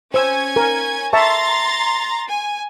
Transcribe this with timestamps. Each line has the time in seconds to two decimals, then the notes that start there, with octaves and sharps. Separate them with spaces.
0.14 C#4 C5 G#5 E6 G#6
0.56 A#4
1.13 E5 A5 A#5 C6 C#6 A6
2.29 G#5